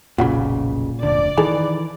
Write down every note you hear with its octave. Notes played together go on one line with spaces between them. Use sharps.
F1 B1 A#2 C#3 F4 F#4 B5
F1 D2 D3 D5
D#3 E3 G#4 A4